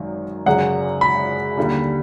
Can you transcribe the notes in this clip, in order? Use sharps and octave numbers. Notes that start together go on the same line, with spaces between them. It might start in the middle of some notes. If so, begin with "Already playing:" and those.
Already playing: G#1 F#2 D#3 F#3
G#1 F#2 C#3 F#3 F#5
B5
D#2 D3 G3